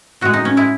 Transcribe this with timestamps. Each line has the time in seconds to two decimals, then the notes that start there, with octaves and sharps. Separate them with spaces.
0.21 A2 G#3 F#4
0.33 D#4
0.45 C#4
0.57 A2 G#3 E4